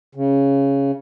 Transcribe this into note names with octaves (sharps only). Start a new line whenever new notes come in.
C#3